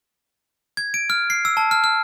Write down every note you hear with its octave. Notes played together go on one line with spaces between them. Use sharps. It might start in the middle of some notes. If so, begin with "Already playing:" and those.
G#6
D7
F6
C7
E6
A5
F6
F6